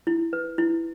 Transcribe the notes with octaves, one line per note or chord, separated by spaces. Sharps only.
E4
B4
E4